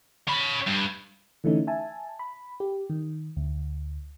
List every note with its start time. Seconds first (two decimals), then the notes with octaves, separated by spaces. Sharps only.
0.28 C#4 B5
0.67 G2
1.44 D3 E3 A3 C#4 D#4
1.67 E5 G#5 A5
2.19 B5
2.60 G4
2.90 D#3
3.37 D2